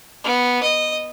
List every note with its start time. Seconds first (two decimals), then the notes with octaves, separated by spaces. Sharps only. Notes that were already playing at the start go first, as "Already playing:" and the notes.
0.24 B3
0.63 D#5